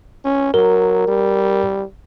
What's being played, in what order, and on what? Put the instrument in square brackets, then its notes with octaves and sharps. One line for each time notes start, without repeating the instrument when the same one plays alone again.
[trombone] C#4
[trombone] F#3 [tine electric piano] A#4
[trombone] G3